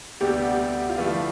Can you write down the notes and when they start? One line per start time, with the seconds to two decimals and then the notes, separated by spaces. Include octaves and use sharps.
0.20 D2 C3 G3 B3 D4 G4
0.89 F4
0.98 D3 F3 A3 E4 G4 B4